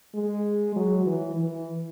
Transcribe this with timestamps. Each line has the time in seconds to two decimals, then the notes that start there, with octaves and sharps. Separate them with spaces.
0.15 G#3
0.76 F#3
1.06 E3
1.36 E3